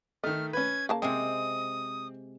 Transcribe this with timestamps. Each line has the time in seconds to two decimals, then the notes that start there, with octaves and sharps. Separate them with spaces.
0.24 D#3 A3 D#5 F6
0.53 C#4 B4 G#6
0.89 C#3 A#3 A5
1.02 C3 G#3 C4 D#6